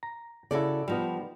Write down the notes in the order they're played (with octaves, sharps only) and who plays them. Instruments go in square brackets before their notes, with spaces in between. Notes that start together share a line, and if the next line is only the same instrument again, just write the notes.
[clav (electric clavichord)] A#5
[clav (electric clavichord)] C#3 E4 [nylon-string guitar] F#4 A4 D5
[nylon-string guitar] F3 D#4 [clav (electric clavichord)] G3 B3